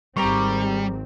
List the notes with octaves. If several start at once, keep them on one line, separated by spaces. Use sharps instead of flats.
G#1 D#3 G3 C4 G4 A#5 C#6